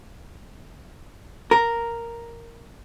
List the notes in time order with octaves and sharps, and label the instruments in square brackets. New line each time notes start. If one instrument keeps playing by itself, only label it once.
[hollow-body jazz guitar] A#4